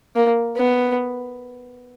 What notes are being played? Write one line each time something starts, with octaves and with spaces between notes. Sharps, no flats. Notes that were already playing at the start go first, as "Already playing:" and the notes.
A#3
B3